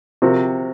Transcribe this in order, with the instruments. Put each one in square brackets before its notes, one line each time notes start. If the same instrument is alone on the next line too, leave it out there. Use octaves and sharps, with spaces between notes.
[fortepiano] C3 F3 C4 F#4 A#4